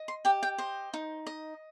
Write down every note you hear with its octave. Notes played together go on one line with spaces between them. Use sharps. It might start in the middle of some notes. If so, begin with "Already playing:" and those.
Already playing: D#5
C6
G4 G5
G5
C5 D#5
D#4
D#5